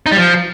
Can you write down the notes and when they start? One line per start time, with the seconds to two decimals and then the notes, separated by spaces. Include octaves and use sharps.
0.06 D#4
0.12 G3
0.17 F3